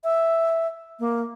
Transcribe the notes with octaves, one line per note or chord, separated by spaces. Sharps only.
E5
A#3